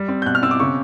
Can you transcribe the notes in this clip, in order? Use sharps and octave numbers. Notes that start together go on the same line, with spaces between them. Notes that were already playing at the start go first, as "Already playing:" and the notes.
Already playing: G3
C4
G6
B2 F#6
F6
C4 E6
D6
C#3 C#6